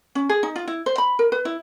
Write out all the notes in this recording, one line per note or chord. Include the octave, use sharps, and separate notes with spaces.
C#4
G#4
D#4
F4
E4
C5
B5
A#4
B4
E4